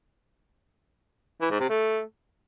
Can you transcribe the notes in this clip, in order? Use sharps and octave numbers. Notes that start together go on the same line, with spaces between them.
E3
G#2
C3
A3